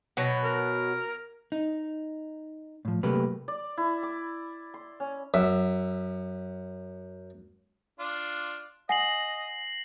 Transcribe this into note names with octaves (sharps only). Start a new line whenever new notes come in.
B2 F#3
A#4
D#4
A2 F3
C3 F#3 A3 A#3 G4 B4
D5
E4
D6
C6
C#4
F#2 E5
D4 F4
D#5 F#5 G#5 A#6 C7 F#7